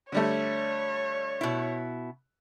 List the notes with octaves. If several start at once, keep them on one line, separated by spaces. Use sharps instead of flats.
D3 G3 A3 C#5
B2 E4